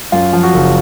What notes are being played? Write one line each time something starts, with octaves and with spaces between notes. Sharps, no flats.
F#2 F4
F3
F#4
F#1